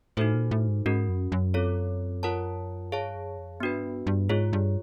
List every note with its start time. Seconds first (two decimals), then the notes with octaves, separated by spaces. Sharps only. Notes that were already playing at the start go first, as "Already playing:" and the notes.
0.17 A2 D#4 F#4 A4 C5
0.34 A#2
0.51 A2
0.68 G#2
0.86 G#2 C#4 F#4 A#4
1.09 F#2
1.32 F#2
1.54 C4 F4 A4 C#5
2.23 F4 A#4 C#5 F#5 A5
2.92 G2 G#4 C#5 F5 A5
3.16 F#2
3.38 F2
3.60 G2 B3 D4 F#4 B4
3.76 G#2
3.84 G2
4.07 G2
4.29 G#2 F4 G#4 C#5
4.53 G2